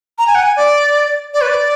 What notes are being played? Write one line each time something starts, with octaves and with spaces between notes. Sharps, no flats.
A#5
G#5
F#5
G#5
D5
D5
B4
D5